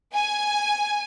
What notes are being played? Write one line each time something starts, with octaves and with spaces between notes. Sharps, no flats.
G#5